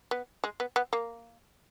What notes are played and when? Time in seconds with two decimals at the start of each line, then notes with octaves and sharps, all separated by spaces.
0.11 B3
0.44 G#3
0.60 B3
0.76 B3
0.93 A#3